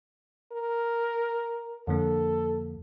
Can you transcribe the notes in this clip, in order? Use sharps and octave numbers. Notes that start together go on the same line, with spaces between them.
A#4
F2 D3 A#3 A4